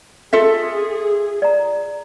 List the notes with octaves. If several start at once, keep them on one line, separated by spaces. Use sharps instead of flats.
F4 G#4 A4 E5
D5 A#5